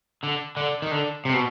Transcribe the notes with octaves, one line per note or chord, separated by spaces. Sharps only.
D3
D3
D#3
D3
C3
B2